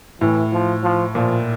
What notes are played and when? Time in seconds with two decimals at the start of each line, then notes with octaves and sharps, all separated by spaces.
0.21 A2 E3
0.52 F3
0.83 F3
1.15 A#2 F3